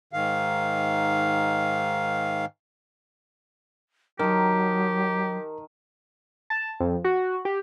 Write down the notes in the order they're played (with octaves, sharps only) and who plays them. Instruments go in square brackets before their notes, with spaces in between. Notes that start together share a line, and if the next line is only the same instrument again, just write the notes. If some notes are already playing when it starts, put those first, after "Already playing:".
[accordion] G#2 D#3 F5
[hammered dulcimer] D#3 A5 [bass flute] F#3 [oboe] G4 [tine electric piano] A#4
[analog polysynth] A5
F2
F#4
G4